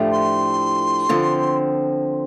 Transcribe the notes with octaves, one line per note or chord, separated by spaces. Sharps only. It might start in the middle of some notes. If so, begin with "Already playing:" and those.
Already playing: A2 F3 A3 D4 G4
C6
D3 F3 C4